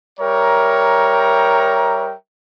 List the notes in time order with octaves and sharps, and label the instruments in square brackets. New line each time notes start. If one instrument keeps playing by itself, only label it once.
[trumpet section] G3 A#4 C#5 E5 G5 A#5